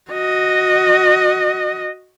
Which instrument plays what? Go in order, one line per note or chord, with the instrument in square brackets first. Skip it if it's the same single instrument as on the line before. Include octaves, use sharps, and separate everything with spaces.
[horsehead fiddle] F#4 D#5